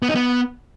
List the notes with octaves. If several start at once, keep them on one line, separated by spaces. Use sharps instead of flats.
B3
D#4
B3